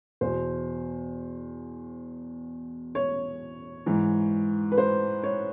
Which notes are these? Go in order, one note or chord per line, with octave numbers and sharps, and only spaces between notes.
E2 B2 C5
C#5
G#2 E3
B4
C5
C#5